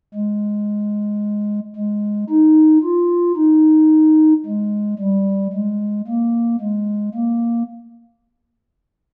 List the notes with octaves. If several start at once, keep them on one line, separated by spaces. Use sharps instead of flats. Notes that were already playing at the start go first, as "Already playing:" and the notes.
G#3
G#3
D#4
F4
D#4
G#3
G3
G#3
A#3
G#3
A#3